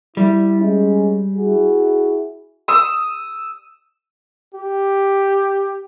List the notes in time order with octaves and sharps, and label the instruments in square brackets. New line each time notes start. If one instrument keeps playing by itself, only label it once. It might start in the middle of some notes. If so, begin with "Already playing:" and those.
[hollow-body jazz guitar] G3 [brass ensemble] E4
[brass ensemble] G#3 C#4
E4 F#4 G#4
[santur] D#6 E6
[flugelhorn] G4